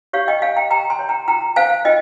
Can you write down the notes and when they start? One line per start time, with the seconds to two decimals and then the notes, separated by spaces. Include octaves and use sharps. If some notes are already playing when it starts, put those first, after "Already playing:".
0.13 G4 C#5 F5
0.28 D#5 G5
0.42 C#5 F5 G#5
0.56 G5 A#5
0.71 G4 G5 A#5
0.90 G#5 C6
0.99 C#5
1.09 G5 A#5
1.28 F4 G5 A#5
1.56 C5 F5 G#5
1.85 F4 D#5 G5